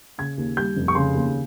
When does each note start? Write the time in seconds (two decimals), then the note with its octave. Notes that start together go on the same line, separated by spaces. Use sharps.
0.18 C#3 G#6
0.38 D#2
0.57 G3 G6
0.76 F1
0.88 C#6
0.95 C#3 C6
1.15 D#2